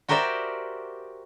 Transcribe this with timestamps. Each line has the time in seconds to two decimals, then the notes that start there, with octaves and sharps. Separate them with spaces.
0.09 F#4 G4 A#4 C5 D5 E5